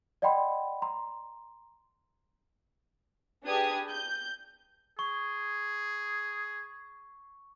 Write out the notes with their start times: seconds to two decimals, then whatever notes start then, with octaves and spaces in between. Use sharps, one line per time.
0.22 D5 D#5 F#5 G5 B5 C6
0.82 A#5 C6
3.44 D4 G4 G#4 B4 D#6 G#6
3.90 G6
4.99 G#4 C#6